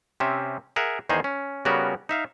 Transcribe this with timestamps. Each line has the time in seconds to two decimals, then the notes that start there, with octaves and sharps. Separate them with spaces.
0.20 C3 C4 C#4 E5
0.76 G#4 A#4 E5 F#5
1.09 E2 D#3 D#4 G#4 C5
1.24 C#4
1.65 C#3 G3 B3 C#4 F#4 A#4
2.09 D#4 E5 F5